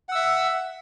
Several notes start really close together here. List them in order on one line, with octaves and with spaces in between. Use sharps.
F#5 E6 E5